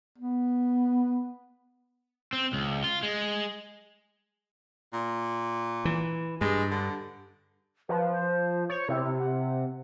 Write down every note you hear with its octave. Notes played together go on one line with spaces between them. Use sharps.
B3
C4
C#2
F4
G#3
A#2
E3
G2 G#3
D3
F3 B4
C5
C5 C#5
C3 E4
F#5